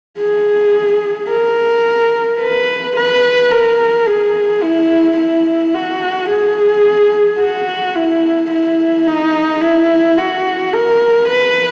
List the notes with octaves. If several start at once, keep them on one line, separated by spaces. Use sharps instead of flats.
G#4
A#4
B4
B4
A#4
G#4
E4
E4
F#4
G#4
F#4
E4
E4
D#4
E4
F#4
A#4
B4